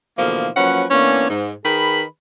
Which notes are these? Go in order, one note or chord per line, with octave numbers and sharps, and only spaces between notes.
B2 D3 E3 F3 A3 A#3
F3 F#3 A#3 C#4 B4 F#5
E3 A#3 B3 C#4 D4 C#5
G#2
D#3 G#4 B4 B5